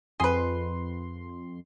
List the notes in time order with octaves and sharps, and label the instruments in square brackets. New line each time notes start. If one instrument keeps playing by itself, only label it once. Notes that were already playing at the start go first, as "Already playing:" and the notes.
[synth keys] F2 C6 [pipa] G#4 B4